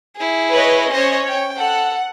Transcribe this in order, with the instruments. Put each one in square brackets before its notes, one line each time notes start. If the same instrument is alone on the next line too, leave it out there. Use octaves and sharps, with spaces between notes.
[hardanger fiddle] E4 G#4
[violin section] B4 C#5 D#5
[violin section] C#4 C#5 [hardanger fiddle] C5 D#5
[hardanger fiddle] G5
[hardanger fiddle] A4 [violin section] F#5